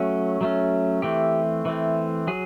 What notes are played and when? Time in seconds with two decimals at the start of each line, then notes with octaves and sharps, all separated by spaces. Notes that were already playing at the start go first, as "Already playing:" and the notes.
Already playing: F#3 A3 C#4
0.41 F#3 A3 C#4
1.02 E3 A3 C4 G4
1.65 E3 A3 C4
2.27 F#3 G#4